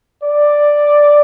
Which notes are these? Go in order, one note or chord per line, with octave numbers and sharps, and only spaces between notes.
D5